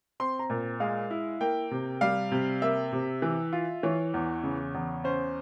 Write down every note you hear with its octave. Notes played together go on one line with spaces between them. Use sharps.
C4 C6
A#5
A#2
G#3 F5
E4
A#3 G5
C3
G3 F5
C3
A#3 E5
C3
E3
F4
E3 C#5
E2
C#3
E2
C#4 C5